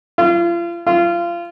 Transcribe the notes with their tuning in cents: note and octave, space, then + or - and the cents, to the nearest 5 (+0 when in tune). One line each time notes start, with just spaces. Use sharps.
F4 -35
F4 -25